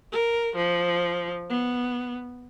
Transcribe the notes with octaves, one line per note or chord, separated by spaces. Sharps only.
A#4
F3
B3